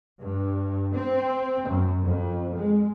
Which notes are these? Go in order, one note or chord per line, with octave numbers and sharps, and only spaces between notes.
G2
C4
F#2
F2
G#3